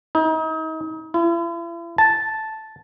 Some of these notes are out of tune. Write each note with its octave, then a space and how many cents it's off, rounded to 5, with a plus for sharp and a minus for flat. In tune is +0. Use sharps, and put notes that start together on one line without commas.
D#4 +35
E4 +45
A5 -5